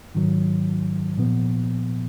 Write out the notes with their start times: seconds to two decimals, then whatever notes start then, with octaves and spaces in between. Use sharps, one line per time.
0.15 G#2 D#3 F#3
1.18 A#2 F3 B3